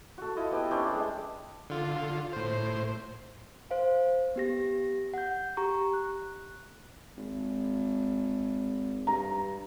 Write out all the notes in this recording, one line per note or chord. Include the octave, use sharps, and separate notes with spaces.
F#4 A4
E4 F4 D#5
B3 G4
C#4 D4 C5 E5
G3 G#3
D3 F4
A2 C5
C5 F5
B3 G4 A#6
F#5 G6
G4 A#5 C#6
F#6
G#1
G2 A#5